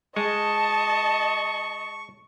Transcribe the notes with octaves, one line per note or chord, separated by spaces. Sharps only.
G#3 D#5 A5 C#6